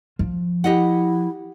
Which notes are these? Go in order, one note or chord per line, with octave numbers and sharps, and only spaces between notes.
F3
E4 G4 D#5 F#5